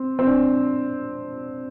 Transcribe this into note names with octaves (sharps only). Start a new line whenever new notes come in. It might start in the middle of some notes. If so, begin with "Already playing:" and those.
Already playing: C4
C4
D4